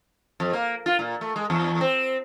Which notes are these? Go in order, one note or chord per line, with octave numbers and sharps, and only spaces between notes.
F2
A#3
F4
A#2
A3
G#3
E2
C4